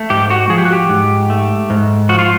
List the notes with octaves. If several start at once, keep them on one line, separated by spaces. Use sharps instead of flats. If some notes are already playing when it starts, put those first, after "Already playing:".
Already playing: A3
G#2 G4
F#4
F3 G#4
G4
F#4
G4
G#2
A3
G#2
F3 F#4
F4